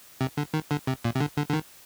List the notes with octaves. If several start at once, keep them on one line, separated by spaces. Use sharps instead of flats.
C3
D3
D#3
D3
C3
A#2
C3
D3
D3
D3
D#3